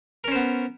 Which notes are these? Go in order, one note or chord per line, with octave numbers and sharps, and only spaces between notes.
B3 C#4 A#4 C5